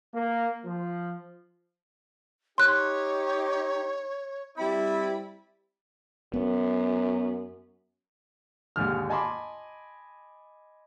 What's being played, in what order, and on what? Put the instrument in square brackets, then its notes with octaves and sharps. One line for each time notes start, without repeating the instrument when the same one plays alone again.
[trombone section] A#3
F3
[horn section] D#4 G4 [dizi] C#5 [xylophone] C6 F#6
[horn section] G3 C4 E4 [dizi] B5
[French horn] F#2 [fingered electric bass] B3
[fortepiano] D#2 G#2 D3 F6
D#5 G#5 A5 B5 C6 D6